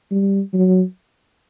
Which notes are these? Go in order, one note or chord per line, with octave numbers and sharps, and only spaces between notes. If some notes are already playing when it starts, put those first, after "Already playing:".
G3
F#3